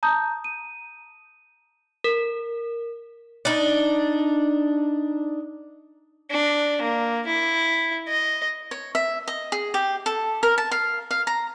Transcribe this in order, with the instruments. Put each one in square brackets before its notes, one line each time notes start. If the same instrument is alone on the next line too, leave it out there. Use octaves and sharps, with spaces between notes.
[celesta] A5 A#5 D#6 G6
D#7
[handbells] A#4
[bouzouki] D4 D#4
[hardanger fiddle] D4
A#3
E4
D#5
[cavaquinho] C#5
E5
D#5
G#4
G4
A4
A#4
A5
F5
F5
A#5